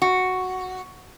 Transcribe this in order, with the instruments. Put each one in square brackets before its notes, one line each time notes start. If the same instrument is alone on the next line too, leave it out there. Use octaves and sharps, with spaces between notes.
[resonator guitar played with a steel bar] F#4